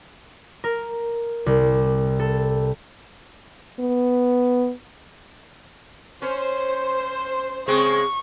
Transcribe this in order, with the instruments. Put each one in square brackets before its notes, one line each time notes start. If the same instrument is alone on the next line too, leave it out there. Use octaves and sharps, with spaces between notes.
[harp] A#4
C2
A4
[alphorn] B3
[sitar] C#4 [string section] C5
[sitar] C#3 G#3 C4 [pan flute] G#4 [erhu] C#6